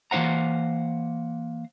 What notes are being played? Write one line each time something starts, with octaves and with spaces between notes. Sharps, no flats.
E3 A#3 D#4 C5 F#5 A#5